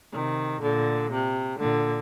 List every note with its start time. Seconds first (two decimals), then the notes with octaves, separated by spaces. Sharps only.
0.14 C3 D#3
0.63 A#2 D3
1.12 C3
1.60 A#2 D3